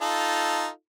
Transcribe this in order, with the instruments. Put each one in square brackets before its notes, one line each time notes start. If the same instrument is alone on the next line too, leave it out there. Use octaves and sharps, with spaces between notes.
[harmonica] D#4 F4 A4